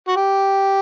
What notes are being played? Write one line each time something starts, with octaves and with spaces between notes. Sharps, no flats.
F#4
G4